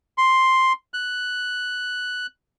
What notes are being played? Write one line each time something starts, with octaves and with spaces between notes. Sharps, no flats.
C6
F#6